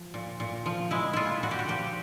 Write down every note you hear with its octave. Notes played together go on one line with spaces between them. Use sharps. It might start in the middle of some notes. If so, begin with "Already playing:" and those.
Already playing: F3
A#2
A#2
F3
G#3 E4
A#2 E4 F4
A#2 F#4
G4
F#4
F3 G4